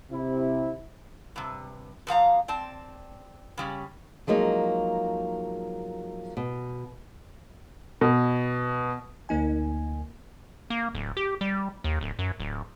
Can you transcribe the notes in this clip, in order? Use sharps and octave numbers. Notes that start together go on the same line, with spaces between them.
C3 E4
G2 C3
F2 F3 F5 A#5
C4 D5 A5
C#3 G3 C#4
F3 F#3 G#3 A#3 D#4
B2
B2
D2 A#3 D#4 G#5
A#3
D1
G4
G3
D#2
D1
F#2
D1